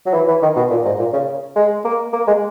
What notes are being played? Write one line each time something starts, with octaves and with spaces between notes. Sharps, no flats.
F#3
E3
E3
D#3
B2
A#2
G#2
A#2
C#3
G#3
A#3
A#3
G#3